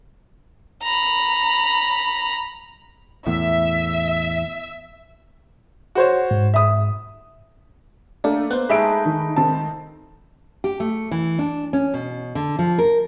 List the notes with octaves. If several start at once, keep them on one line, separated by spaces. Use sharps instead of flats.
A#5 B5
E2 A2 E5
F#4 C5 C#5
G#2
E5 D#6
A3 A#3 D4
B3 C5 F#6
G#3 A3 D#4 G#4 E5 B5 D7
D#3 G#4
D#3 C4 A5
G4
A3
E3
D4
C#4
B2
D3
F3
A#4